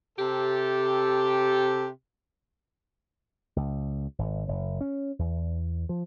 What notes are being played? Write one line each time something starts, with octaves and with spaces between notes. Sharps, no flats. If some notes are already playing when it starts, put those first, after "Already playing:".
C3 G4 A4
C#2
G#1
F#1
C#4
E2
F3